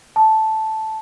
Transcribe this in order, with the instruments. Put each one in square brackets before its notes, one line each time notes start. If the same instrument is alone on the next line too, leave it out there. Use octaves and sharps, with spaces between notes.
[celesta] A5